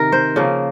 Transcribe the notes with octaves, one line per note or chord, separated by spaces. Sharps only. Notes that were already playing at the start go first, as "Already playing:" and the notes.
Already playing: C3 D#3 A#4
C5
C#3 F3 A#3